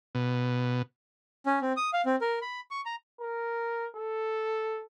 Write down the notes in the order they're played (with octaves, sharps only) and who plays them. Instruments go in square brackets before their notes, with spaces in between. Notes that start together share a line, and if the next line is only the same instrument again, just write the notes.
[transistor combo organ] B2
[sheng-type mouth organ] C#4
C4
D#6
F5
C4
A#4
B5
C#6
A#5
[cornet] A#4
A4